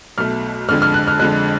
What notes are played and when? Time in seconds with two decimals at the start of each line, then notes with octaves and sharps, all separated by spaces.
0.18 B1 B2 A3 F6
0.69 F2 D3 G#3 F6
0.82 F6
0.94 F#6
1.07 F6
1.19 F2 D3 G#3 F#6